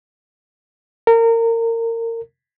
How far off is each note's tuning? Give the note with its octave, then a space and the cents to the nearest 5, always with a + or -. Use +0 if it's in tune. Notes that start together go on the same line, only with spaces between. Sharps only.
A#4 -25